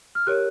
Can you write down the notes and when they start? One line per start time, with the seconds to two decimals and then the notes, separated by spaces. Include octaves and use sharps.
0.15 F6
0.27 G4 A#4 C#5 F#6